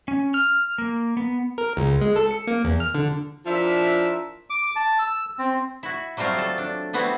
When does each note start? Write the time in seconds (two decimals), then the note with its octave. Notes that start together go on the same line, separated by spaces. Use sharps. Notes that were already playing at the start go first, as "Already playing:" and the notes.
0.08 C#4
0.34 F6
0.78 A#3
1.17 B3
1.58 A#4
1.77 C#2
2.01 G#3
2.16 A4
2.31 C#7
2.47 A#3
2.64 E2
2.80 F6
2.95 D3
3.47 F3 D4 E4 A#4 E5
4.50 D6
4.76 A5
4.99 E6
5.39 C4
5.83 E4 F#4
6.17 F#3 G3 A3 C4 F4
6.39 A4
6.58 D4
6.93 G3 B3 C4 E4 F#4